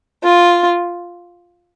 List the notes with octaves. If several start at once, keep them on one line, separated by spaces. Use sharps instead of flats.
F4